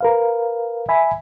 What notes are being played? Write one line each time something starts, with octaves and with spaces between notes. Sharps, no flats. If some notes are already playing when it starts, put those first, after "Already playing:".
A#4 B4 F5
E5 G#5 B5